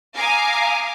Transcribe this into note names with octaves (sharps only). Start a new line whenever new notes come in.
F5 G#5 A#5 D6 D#6